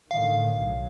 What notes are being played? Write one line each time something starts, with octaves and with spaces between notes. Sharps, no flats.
A2 D3 D#3 F5
B1 F#3